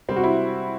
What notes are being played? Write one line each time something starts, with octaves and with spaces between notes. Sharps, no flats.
C3 G3 C4
F#4
E4